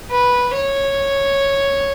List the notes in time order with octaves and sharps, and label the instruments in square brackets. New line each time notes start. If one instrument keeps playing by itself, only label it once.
[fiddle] B4
C#5